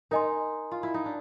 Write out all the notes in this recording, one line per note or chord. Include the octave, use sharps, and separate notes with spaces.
D#4 A#4 D#5 G#5 C6
F4
E4
D#4
D4